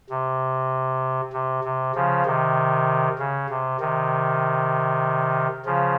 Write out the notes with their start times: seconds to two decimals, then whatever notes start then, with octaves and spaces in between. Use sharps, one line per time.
0.10 C3
1.33 C3
1.64 C3
1.95 C#3 F3
2.26 C3 D#3
3.19 C#3
3.50 C3
3.80 C3 D#3
5.65 C#3 F3